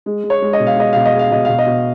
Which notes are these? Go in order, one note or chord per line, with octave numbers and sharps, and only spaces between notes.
G#3
G#3
C#5
G#3
D#5
B2
F5
G#3 D#5
B2 F5
D#5
G#3
F5
B2 D#5
B2 F5
D#5
B2